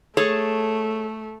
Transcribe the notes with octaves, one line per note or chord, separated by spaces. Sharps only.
A3 G#4 A4 C#5